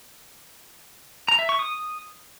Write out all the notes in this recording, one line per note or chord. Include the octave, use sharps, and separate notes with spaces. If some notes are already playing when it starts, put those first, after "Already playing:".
A#5
E5
C#6
D#6